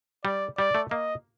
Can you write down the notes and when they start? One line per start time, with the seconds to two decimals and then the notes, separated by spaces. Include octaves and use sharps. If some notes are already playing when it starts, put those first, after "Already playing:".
0.25 G3 D5
0.58 G3 D5
0.75 A3
0.91 A#3 D#5